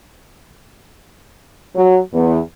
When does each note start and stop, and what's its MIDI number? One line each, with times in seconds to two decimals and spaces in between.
1.75 1.99 54
2.13 2.39 40